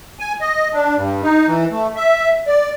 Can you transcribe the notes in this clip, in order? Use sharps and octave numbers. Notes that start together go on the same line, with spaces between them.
G#5
D#5
D4
G2
D#4
E3
A3
E5
D5